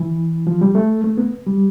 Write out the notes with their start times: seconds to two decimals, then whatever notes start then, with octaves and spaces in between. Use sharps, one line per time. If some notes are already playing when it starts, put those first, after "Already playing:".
Already playing: E3
0.47 F3
0.61 G3
0.75 A3
1.04 A3
1.18 B3
1.47 G3